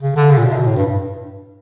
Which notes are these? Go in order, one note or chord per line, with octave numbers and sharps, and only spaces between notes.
C#3
D3
C#3
A#2
B2
C3
B2
A2
G2
G2